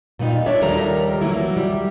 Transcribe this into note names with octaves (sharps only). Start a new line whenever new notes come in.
A#2 G3 B3 D#4 F4
D4 C#5 D5 E5
D#2 F3 G3 A4 A#4 A#5
E3 F#3 A3 A#3 E4
G3